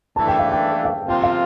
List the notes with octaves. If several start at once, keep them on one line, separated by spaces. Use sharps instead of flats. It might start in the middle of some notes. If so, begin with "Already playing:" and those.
E3 A3 D4 A5
G5
F5
G5
F5
C3 F3 C4 F4 G5
F5